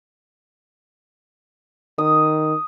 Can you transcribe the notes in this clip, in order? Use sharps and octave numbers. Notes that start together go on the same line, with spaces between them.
D#3 D#6